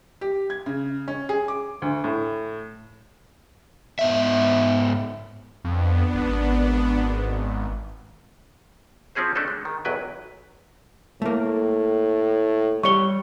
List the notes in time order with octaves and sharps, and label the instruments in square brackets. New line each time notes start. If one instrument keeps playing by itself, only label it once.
[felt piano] G4
G#6
C#3
C#4
G#4
D6
D2
A2
[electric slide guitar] G#2 B3 E5
[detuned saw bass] F2 [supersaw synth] B3 D4
[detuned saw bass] G#1
[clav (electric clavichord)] F3 C4 C#4 G#4 C5
A3 C#4 D4 A4 D#5
G#3
D#3
B1 E2 F#3 B4 G5 G#5
[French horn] A2 [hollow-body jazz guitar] A3 A#3
[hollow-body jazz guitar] G3 C#5 [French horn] G4 [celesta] C#6 G7